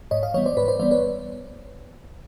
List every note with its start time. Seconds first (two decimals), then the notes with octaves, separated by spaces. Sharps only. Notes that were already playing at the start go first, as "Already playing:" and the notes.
0.11 G#2 C#5 D#5
0.23 D#5 F5
0.34 E3 G3 B3 C#5 D#5
0.46 C5 D5
0.57 G#2 B4 C#5
0.68 C5 D5
0.80 E3 G3 B3 C5 D5
0.91 B4 C#5